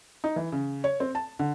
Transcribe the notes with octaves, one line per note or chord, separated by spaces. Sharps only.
D#4
E3
C#3
C#5
C4
A5
D3